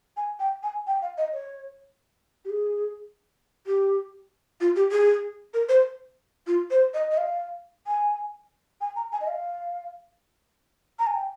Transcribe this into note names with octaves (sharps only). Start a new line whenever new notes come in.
G#5
G5
G#5
G5
F5
D#5
C#5
G4
G#4
G4
F4
G4
G#4
A#4
C5
F4
C5
D#5
D#5
F5
G#5
G#5
A#5
G#5
D#5
F5
A#5
G#5
G5